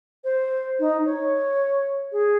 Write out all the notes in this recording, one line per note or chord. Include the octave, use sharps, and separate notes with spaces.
C5
D#4
C#5
G#4